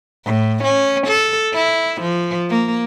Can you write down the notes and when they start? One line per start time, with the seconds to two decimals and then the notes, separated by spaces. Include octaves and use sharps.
0.25 A2
0.64 C#4
1.07 A4
1.53 E4
2.02 F3
2.50 A#3